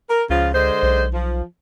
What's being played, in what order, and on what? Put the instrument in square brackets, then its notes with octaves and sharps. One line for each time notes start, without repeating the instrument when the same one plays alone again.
[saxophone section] A#4
[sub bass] C#2 [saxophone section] C#3 F3 F4
[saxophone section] D3 G#3 C5
[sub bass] B1
[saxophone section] F3